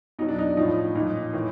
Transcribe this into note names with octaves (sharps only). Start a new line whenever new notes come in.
B2 F#3 D#4
D4
D#4
A2 F3 D#4
A#2 F3 D#4
A2 E3